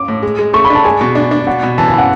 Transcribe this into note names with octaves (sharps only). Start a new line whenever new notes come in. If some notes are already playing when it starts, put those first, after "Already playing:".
Already playing: D6
A2
G#3
G#3
A3 C#6
B5
D4 A5
G#3 G#5
B2
D4
D4
B2 F#5
B2
E3 A5
G#5
E3 F#5